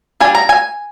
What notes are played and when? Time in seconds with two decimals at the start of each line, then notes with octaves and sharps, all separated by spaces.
0.20 G3 D4 G#5
0.35 A#5
0.49 G#5